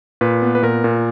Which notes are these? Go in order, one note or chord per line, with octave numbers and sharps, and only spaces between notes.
A#2 B4
B3
B4
A#2 A#4
A#2